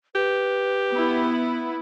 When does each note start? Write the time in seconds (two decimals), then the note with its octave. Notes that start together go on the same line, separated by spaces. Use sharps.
0.15 G4 B4
0.92 B3 E4